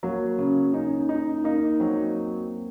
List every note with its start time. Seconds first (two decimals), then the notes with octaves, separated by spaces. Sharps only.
0.03 F#3 A#3
0.39 C#3
0.74 C#4 D#4
1.09 D#4
1.44 A#3 D#4
1.80 F#3 C4